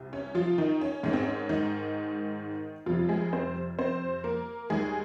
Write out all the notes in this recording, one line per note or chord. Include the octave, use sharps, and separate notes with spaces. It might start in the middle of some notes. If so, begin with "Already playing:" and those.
Already playing: C2 C3
C#4
F3 F4
D#3 D#4
C#4
G#2 D#3 G#3 C#4
C4
C#4
D#3 D#4
F2 C3 F3 G3 F4
G#3 G#4
C4 C5
C4 C5
A#3 A#4
D#2 D#3 G3 G#3 G#4